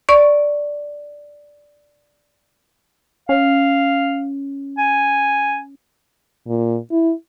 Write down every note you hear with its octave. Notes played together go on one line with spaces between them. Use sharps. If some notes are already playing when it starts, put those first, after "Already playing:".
D5 C#6
C#4 F5
G#5
A#2
E4